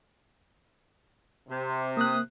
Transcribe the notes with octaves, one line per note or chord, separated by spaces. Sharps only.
C3
A#3 D#6 F#6